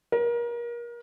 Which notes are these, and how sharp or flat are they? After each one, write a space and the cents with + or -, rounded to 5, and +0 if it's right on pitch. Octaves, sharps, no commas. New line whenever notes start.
A#4 +30